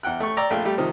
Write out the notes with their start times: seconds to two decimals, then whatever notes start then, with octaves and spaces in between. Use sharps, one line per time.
0.03 E2 F#5 G5 F#6
0.20 A3 G5 C#6
0.37 D5 G5 A#5 E6
0.50 A#1 A3 F4 G5
0.65 G3 A3 G4
0.78 C3 D#3 F3